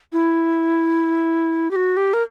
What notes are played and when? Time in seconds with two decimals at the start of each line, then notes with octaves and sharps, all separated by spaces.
0.13 E4
1.71 G4
1.76 F#4
1.97 G4
2.13 A#4